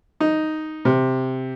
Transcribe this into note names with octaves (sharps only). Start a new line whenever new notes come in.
D#4
C3